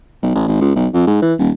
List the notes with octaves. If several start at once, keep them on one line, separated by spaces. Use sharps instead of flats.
B1
A1
G#1
C#2
B1
F2
G#2
E3
D#1